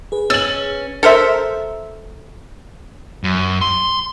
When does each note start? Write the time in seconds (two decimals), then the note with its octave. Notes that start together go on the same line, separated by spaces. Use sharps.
0.12 G#4 B4
0.30 C#4 E6 A6 F#7
1.03 A4 A#4 C5 E5
3.24 F#2
3.61 C6